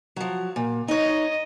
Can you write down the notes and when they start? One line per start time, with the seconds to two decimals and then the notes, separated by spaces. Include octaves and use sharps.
0.16 F3 F#3
0.56 A#2
0.88 D#4 C#5 D#5